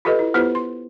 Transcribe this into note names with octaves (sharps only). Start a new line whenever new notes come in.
F4 G4 A4 B4 D#5
E4
B3 E4 F4 G4 B4 C5
C6